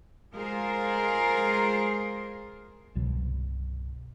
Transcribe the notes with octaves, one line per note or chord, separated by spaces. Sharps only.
G#3 F4 G#4 A#4 C5
G1 C2 B2 F#3